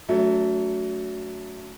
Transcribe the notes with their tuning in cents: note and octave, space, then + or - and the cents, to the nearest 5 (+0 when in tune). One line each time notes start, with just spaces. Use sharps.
F#3 +0 A3 +0 C#4 +45